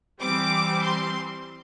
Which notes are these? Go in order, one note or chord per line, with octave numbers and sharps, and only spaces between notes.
E3 G3 C4 D6
C6